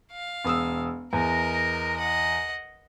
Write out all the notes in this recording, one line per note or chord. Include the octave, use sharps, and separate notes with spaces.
F5
E1 D#6 E6
E2 A#4 D#5
D#5 F#5